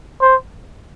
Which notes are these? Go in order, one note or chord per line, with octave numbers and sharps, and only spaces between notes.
C5